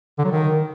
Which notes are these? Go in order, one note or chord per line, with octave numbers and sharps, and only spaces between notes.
D3
F#3
D#3